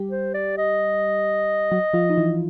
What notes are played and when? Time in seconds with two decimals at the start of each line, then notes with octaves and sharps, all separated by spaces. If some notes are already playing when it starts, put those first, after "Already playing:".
Already playing: G3 G4
0.11 C5
0.34 D5
0.58 D#5
1.72 F#3 F#4
1.94 F3 F4
2.10 D#4
2.17 E3 E4